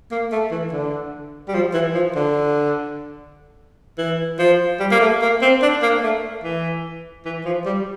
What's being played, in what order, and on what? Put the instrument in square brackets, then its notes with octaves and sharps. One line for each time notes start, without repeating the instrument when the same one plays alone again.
[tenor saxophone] A#3
A3
E3
D3
G3
F3
E3
F3
D3
E3
F3
G3
A#3
A3
A#3
C4
D4
A#3
A3
E3
E3
F3
G3